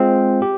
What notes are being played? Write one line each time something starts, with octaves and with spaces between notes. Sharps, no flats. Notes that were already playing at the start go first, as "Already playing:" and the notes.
Already playing: G#3 C4 F4
G4